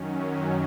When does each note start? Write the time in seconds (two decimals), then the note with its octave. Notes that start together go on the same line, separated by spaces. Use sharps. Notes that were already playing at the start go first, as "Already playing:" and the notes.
Already playing: F#2 D#3 F#3 C#4